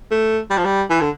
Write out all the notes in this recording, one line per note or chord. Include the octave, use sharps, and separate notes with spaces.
A3
G3
F3
G3
E3
D3